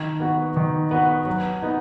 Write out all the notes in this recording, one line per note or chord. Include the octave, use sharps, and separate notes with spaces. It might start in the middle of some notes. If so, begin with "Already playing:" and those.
Already playing: D#3
B3 F#4 B4
D#3
B3 F#4 B4
F#3
B3 D#4